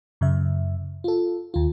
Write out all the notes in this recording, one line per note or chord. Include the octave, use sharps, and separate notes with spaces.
F#2 C#3 E5
F4 A4
D#2 F4